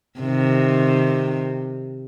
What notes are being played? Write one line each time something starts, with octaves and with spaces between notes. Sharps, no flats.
C3 D#3